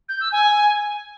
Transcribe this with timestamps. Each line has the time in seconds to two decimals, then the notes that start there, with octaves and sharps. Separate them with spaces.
0.08 G6
0.20 E6
0.31 G#5